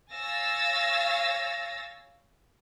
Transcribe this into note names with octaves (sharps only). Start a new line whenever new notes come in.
C#5 F5 G#5 E6 A6 A#6